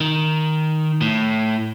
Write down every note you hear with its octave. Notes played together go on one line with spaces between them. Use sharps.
D#3
A2